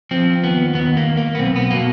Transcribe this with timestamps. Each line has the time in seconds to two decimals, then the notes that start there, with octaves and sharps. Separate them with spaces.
0.11 F3 C4
0.43 D#2 B3
0.75 D#2 B3
0.97 A#3
1.07 D#2
1.17 A#3
1.35 B3
1.38 B1 C4
1.56 B3
1.71 B2 A#3